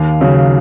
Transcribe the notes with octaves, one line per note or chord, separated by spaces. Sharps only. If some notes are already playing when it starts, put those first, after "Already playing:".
Already playing: D#2 F5
C#3 F#3